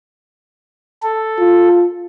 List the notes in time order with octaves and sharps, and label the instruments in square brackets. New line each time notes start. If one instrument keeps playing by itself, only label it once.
[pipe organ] A4
[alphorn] F4